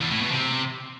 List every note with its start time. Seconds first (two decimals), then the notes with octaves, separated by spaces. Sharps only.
0.01 E2
0.11 A2
0.22 B2
0.32 C3